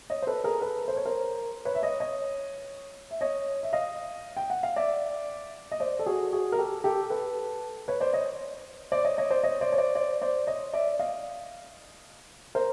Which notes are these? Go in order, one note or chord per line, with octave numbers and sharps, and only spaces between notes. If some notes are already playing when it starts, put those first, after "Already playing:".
C#5 D#5
C5
A4 B4
G#4 A#4
A4 B4
C5
C#5
A#4 C5
B4 C#5
E5
C#5 D#5
C#5 D#5
E5
C#5 D#5
E5
D#5 F5
G5
F#5
F5
D5 E5
D#5
C5 D5
A4
F#4 G#4
F#4 G#4
A#4
G4 A4
G4 A4
A4 B4
B4 C#5
C5 D5
C#5 D#5
C5 D5
C#5 D#5
C#5 D#5
C5 D5
C#5 D#5
C5 D5
C#5
C5 D5
C5 D5
C5 D5
C#5 D#5
D5 E5
D#5 F5
A#4 C5